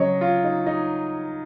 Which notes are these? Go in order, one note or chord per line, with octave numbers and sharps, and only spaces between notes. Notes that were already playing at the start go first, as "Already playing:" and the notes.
Already playing: C#3 F#3 C#5 D#5
F4
D#4
D#4